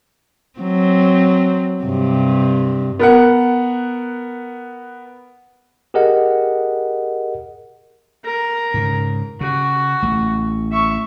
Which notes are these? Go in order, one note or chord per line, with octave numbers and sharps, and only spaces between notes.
F#3 C4
G2 C3
B3 A#4 F#5
G4 G#4 A#4 D#5 F#5
A#4 A#5
G#2 C#3
C#3 F#4
A1 A3
E5 C#6